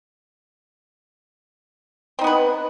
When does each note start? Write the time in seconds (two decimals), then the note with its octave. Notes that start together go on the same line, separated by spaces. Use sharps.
2.19 C4
2.21 D#4
2.24 B3
2.27 B4